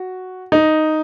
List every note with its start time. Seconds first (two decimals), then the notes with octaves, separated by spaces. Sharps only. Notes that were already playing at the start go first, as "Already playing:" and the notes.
Already playing: F#4
0.52 D#4